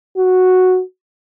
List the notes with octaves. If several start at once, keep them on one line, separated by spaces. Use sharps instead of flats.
F#4